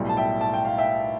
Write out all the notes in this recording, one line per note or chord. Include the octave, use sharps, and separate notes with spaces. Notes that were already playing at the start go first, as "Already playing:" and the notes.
Already playing: B1 A2 G3
A5
E5 G5
A5
G5
F5
E5 G5